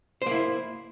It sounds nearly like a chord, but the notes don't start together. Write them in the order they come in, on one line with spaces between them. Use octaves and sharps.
C5 A#3 E4